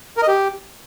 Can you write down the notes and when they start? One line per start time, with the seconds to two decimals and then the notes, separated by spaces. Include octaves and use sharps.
0.17 A#4
0.22 D#5
0.28 G4